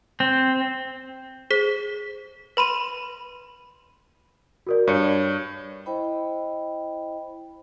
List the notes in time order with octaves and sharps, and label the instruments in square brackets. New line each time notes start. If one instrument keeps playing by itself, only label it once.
[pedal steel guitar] C4
[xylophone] G#4 C5 B6 G7
B4 B5 C6 D#7
[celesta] F#4 A#4 D5
[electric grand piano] G2 [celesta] C#5 D5 C#7
[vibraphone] E4 C5 D#5 G5 B5